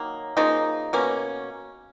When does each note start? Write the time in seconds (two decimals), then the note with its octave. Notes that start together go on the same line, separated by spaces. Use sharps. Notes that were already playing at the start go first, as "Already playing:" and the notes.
Already playing: D#3 F#3 A#3
0.37 C#3 F3 A#3 D#4
0.93 B2 A#3 C#4